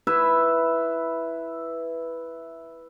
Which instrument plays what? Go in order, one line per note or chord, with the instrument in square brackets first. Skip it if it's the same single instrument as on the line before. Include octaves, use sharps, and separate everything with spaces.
[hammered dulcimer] E4 B4 E5